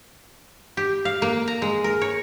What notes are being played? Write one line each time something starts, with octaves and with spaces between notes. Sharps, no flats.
G4
F5
A#3
A#5
G#3
A#4
C#5